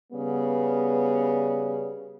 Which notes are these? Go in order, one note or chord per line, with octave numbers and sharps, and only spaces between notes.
C#3 G3 B3